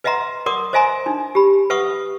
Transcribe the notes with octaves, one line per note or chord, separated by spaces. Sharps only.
B4 D#5 E5 F#5 A#5 C6
A#4 D5 F#5 C6 D6 D#6
C5 D#5 E5 G#5 A#5 C6
D4 D#4
G4 B5
B4 E5 F#5 C#6 D#6